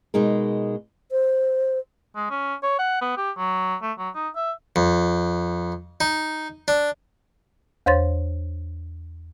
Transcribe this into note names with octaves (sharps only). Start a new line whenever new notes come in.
B2 G#3 D#4 G#4 A#4
C5
G#3
C#4
C#5
F#5
B3
G4
F#3
A3
F#3
D#4
E5
F2
D#4
D4
E2 C5 C#5 C6 A6